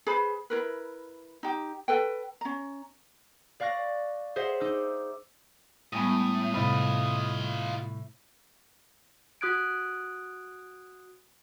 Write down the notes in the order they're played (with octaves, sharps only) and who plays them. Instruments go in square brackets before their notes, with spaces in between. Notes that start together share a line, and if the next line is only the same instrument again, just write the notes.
[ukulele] G#4 B4 C5 B5
E4 A#4 B4
D#4 G4
A4 B4 G5
C#4 A#5
[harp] D5 F5 C#6 F#6 A#6
G#4 C5 D#5 E5 F#5
D#4 D6 E6
[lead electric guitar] A2 [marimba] G3 G#3 B3 [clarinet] D#6
[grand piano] A2 B5 [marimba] C3 [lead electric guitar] F4 D#5
[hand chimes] F#4 D#6 F#6 G#6 D7